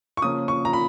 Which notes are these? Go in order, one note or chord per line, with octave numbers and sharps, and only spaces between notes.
C#6
C#3 F3 A#3 C#4 D#6
C#6
A#5
B5